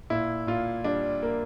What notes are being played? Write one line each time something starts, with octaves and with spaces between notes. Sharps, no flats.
A#2 E4
A#2 F4
G3 D4
A#3